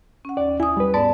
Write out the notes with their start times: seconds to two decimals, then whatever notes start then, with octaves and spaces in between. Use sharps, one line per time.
0.25 C#4 F#5
0.37 D#2 D5
0.60 E4 G#5 D#6
0.77 G3 B4
0.94 G#2 B3 D5 A5 B5